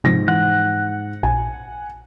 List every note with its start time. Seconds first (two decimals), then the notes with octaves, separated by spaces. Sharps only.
0.04 G#2 C3 F3 A#6
0.28 E3 F#5
1.23 A#1 G#5